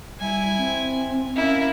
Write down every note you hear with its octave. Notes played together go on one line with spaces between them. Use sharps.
G3 E4 G#5
C4
A#3 C#4 E4